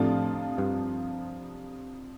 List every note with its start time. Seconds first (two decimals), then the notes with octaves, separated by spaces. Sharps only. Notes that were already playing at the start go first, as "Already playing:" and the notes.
Already playing: F2 A2 C3 F3 A3 D4 F4
0.58 G2